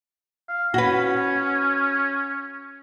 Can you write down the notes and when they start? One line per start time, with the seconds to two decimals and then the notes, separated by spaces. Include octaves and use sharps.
0.49 F5
0.74 C#4 F#4 B4